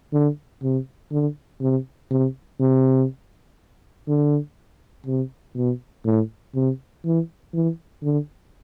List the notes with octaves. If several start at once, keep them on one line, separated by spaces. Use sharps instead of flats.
D3
C3
D3
C3
C3
C3
D3
C3
B2
A2
C3
E3
E3
D3